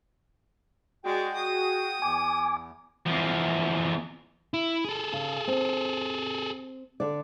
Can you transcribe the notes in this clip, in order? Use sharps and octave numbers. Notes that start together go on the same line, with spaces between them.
G#3 F#4 G#4 D5 G5
D#6
E2 G#5 D6
E2 F3
E4
G#4 A4
C#3
C4
D3 D5